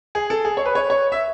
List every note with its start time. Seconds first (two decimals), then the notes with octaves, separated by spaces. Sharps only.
0.15 G#4
0.30 A4
0.45 G#4
0.57 C#5
0.65 B4
0.75 C#5
0.90 C#5
1.12 E5